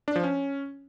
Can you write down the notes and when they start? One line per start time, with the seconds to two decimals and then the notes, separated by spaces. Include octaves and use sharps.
0.08 D4
0.16 F3
0.23 C#4